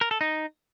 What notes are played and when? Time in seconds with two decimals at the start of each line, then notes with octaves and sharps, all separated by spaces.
0.01 A#4
0.11 A4
0.21 D#4